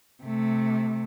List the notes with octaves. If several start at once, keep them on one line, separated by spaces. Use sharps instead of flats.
C3 A3